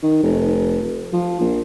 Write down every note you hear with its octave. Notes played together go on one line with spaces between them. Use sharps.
D#3
F1
F3
A#1